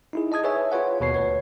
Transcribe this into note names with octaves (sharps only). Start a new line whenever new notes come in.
D#4 E4 G#4
D#5 A5 D#6 G#6
G#4 B4 C#5 E5 G#5
F4 B4 C#5 F#5
D#2 B2 C#5 C7
D2 B4 C#5